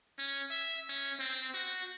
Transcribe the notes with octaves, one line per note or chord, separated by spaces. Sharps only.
C#4
E5
C#4
C4
F#4